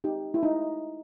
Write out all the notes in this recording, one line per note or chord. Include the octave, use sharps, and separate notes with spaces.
D#4 G4
E4
D#4